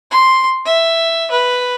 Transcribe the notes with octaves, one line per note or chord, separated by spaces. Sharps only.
C6
E5
B4